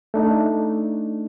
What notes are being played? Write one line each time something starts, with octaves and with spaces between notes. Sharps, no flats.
A3 D4 D#4